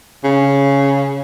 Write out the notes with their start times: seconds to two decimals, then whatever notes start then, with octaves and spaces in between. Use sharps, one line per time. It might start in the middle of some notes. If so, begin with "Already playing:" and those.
0.24 C#3